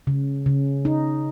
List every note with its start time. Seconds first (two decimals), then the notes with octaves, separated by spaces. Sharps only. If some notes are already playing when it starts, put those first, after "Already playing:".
0.07 C#3
0.46 C#3
0.85 D#4